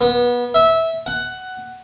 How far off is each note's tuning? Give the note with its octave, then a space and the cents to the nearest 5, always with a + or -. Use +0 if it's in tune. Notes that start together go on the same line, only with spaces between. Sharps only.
B3 -25
E5 -15
F#5 +10